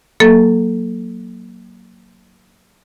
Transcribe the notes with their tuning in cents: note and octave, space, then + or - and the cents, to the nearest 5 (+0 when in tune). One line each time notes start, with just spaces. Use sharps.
F#3 +0 A#3 +0 A4 +0